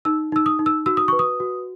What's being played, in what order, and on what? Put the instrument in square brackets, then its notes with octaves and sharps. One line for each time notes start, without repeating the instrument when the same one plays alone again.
[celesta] D#4 E6
D#4 E6
D#6
D#4
E6
F#4 E6
D#6
B4 C#6
D#6
F#4